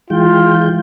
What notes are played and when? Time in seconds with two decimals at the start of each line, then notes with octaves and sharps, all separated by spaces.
0.10 E3 G#3 F4 G5